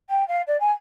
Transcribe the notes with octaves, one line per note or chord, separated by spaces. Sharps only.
G5
F5
D5
G#5